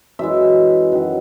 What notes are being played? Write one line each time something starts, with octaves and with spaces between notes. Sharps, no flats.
F#2 E3 G#3 E5
F#2 D#3 F#3